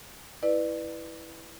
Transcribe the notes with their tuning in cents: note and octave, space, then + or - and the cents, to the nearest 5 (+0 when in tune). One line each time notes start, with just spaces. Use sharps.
E4 -5 B4 +0 D5 +25